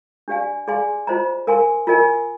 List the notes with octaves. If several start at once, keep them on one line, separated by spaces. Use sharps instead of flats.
D4 G4 D5 F5 G#5
G#4 D5 F5 G#5 C6
F4 C5 D#5 A#5
A#4 F5 G#5 C6
F4 A#4 D#5 G#5